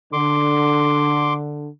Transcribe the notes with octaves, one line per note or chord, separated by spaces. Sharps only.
D3 C6 D6